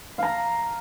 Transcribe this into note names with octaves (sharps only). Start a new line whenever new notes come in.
F5 A#5